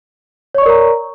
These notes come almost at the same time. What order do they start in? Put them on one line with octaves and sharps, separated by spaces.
C#5 C#6 D5 A#4 A#5